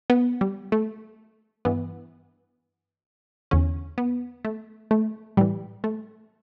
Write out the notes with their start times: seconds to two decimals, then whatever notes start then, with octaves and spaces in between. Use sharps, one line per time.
0.10 B3
0.41 G3
0.72 A3
1.65 G2 E3 B3
3.51 E2 D3 C#4
3.98 B3
4.45 A3
4.91 A3
5.37 A2 E3 G3
5.84 A3